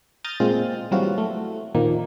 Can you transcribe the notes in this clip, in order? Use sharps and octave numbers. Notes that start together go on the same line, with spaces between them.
A#5 D#6 F6 G6 A6
A#2 G#3 C4 F4
E3 F#3 G3 C4 F4 F#4
A3
A#2 D#3 F3 A#3